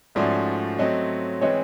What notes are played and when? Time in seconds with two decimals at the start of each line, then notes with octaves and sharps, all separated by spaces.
0.15 G#2 F3 A3 C#4 F#4 D5 E5
0.78 F#3 A3 C4 C#5 D#5
1.42 E3 G#3 C4 C#5 D#5